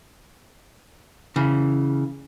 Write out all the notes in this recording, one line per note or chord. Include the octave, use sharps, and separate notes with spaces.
C#3 E3